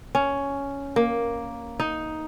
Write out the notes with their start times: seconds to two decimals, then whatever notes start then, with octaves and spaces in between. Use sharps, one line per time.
0.15 C#4
0.96 A#3
1.80 D#4